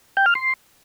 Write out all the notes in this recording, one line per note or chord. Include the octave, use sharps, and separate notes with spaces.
G5
F6
C6